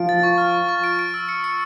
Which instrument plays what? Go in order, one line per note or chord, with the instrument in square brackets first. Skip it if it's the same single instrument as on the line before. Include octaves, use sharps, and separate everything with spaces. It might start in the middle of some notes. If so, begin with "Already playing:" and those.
Already playing: [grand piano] F3 F4 [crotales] D7
[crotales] A6
C#6
F6
C#6
C#6
D7
D7
E6
C#7
C#7